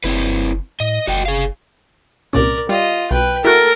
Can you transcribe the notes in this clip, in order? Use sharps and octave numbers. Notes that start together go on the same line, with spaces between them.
F#1 C4 E4 B4
A2 D#5
F#1 F#4 D#5 G5
G#4 F5
C2 A#2 C#4 A#4 D5
G3 F4 D#5
B1 B4 G5
E4 F#4 A4 A#4